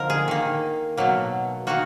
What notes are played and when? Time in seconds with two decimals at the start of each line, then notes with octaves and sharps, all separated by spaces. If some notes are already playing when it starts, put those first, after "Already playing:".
Already playing: D3 F3 A#3 D#4 A#4
0.10 G#4
0.28 D#3 A#3
0.97 B2 F#3 A#3
1.67 D#3 A#3 F#4